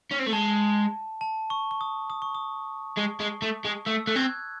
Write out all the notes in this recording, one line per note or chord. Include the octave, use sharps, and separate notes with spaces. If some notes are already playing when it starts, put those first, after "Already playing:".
C#4
C4
A3
G#3 A5
A5
C#6
C#6
D#6
D#6
C#6
D#6
G#3
G#3
A3
G#3
A3 E6
A3 F#6
C4 G#6